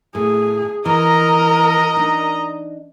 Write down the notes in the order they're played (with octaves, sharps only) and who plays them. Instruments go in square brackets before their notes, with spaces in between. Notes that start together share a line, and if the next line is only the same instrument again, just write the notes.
[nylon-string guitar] A2 [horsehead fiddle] G#4
[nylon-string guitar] E3 [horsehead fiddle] A#4 [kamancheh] D#5 A#5
[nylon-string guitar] D4 D#4